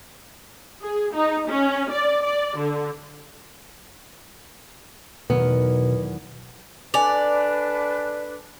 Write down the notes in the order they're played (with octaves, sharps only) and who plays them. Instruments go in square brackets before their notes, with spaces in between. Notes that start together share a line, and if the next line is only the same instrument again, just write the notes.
[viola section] G#4
D#4
C#4
D5
D5
D3
[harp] E2 D#3 F#3 [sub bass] B2 [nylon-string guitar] B3
[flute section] D4 A4 B4 [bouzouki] D5 [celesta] G#5 F7